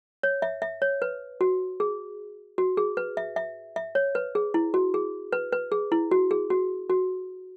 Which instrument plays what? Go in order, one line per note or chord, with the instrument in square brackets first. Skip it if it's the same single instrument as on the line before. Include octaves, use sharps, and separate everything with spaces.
[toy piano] C#5
E5
E5
C#5
B4
F#4
G#4
F#4
G#4
B4
E5
E5
E5
C#5
B4
G#4
E4
F#4
G#4
B4
B4
G#4
E4
F#4
G#4
F#4
F#4